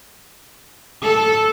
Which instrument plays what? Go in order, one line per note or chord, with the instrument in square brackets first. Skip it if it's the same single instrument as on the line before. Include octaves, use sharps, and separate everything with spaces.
[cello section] A4